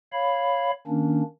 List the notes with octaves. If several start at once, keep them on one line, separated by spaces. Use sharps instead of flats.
C#5 F5 B5
D#3 A#3 C#4 D4